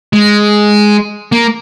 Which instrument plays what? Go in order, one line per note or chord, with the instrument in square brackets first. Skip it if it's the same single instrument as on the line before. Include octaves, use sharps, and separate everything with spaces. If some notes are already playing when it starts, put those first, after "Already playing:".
[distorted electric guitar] G#3
A#3